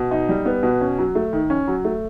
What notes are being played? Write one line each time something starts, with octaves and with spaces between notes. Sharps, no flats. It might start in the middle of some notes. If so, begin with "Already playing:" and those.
Already playing: B2
D#4
G3
B3
B2
C#4
F#3
A3
D#3
C#4
F#3
A3